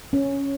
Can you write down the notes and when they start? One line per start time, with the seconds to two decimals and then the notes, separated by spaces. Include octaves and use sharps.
0.13 C#4